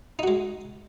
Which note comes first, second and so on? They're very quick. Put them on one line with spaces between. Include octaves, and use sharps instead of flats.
D#4 F#4 G#3